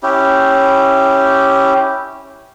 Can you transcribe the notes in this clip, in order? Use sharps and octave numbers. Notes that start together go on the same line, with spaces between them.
C#4 E4 G4